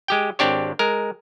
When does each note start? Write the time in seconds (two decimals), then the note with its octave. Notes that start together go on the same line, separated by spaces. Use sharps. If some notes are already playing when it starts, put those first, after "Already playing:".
0.08 G#3 G4 G5
0.39 G#1 C4 D4 G4 C#5
0.79 G#3 A#4